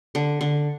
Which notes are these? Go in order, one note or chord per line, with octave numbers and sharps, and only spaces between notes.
D3
D3